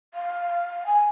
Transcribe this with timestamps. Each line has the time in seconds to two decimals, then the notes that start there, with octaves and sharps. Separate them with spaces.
0.14 F5
0.86 G#5